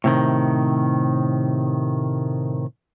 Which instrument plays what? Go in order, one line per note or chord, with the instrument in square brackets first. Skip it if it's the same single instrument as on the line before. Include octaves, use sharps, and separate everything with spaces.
[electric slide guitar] A2 C3 D#3